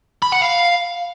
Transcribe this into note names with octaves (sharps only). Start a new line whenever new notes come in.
B5
F#5
F5